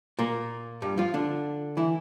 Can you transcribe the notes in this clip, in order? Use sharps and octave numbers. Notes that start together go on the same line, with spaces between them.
A#2 A#3
G2 G3
F3 F4
D3 D4
E3 E4